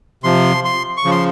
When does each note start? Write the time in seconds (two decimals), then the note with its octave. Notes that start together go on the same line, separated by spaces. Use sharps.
0.24 C3 F3 C6
0.65 C6
0.97 C#6
1.05 C#3 F3
1.11 C6